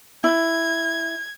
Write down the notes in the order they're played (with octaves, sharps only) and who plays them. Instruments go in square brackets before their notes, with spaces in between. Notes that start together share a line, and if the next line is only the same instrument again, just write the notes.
[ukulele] E4 [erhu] G#6